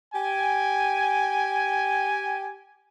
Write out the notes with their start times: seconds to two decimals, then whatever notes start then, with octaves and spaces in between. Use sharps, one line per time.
0.14 G4 G5 G#5